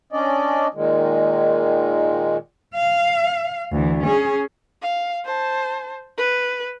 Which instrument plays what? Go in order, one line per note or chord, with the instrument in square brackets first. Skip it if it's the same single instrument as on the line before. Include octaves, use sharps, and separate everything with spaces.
[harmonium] C#4 D4 D5 D#5
A#2 D#3 G#3
[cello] F5
D2 E3
C#4 G#4
[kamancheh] F5
C5 A5
B4